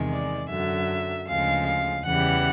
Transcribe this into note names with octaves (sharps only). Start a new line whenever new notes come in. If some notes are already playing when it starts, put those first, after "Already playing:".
Already playing: E2 C3 D#3 G#3
D5
F#2 D3 F#3 E5
D2 C#3 F3 G#3 F5
F5
E2 C#3 E3 G3 F#5